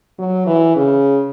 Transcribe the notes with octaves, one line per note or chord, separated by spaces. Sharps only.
F#3
E3
C#3